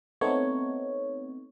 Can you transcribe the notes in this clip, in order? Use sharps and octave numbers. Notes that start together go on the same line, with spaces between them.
A3 B3 C4 D#4 C#5